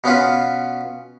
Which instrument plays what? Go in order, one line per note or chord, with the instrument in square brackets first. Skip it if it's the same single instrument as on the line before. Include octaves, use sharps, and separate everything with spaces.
[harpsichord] B2 B3 C#4 F4 B4